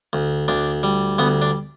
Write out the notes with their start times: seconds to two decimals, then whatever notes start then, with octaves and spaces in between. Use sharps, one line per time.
0.13 D2
0.48 D2 D4
0.83 G3
1.19 D2 B3
1.42 D4